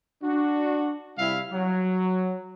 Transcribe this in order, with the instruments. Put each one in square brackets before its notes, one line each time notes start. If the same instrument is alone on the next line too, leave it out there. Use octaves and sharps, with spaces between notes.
[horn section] D4 F#4
C3 G3 E4 E5 F5
F#3